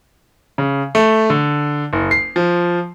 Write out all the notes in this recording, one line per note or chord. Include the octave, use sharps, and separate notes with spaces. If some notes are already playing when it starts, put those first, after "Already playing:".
C#3
A3
D3
F#1
C7
F3